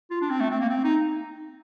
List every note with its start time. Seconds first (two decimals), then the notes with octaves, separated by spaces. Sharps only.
0.11 F4
0.21 D4
0.30 C4
0.40 A3
0.51 C4
0.60 A#3
0.70 C4
0.84 D#4